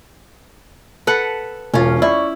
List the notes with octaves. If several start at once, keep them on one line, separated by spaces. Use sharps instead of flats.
A4 B4 F#5
E1 C#4 F4
E4 D5 C#6